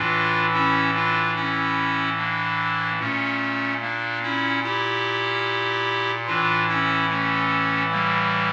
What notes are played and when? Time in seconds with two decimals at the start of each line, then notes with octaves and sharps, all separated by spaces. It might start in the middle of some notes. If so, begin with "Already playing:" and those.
Already playing: A2 E3 D4 F4
0.53 C#4 E4
0.95 D4 F4
1.36 C#4 E4
2.18 A#3 D4
3.00 A#2 A3 C#4
3.82 A#3 D4
4.23 C#4 E4
4.63 E4 G4
6.27 A2 E3 D4 F4
6.69 C#4 E4
7.09 A3 C#4
7.91 G3 A#3